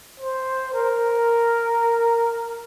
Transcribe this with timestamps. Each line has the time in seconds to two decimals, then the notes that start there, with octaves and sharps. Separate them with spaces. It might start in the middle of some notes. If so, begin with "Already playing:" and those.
0.20 C5
0.74 A#4